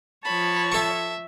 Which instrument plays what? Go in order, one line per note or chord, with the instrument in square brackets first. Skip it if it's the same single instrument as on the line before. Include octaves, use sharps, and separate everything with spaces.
[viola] F3 C#5 [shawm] A5 [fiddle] B5
[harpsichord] A4 C#6 [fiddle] E5